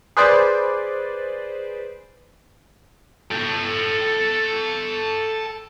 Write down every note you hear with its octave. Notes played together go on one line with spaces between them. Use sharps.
G#4 B4 C5 D5
A4 G5